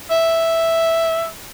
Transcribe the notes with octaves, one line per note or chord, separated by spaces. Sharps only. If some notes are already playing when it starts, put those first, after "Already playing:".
E5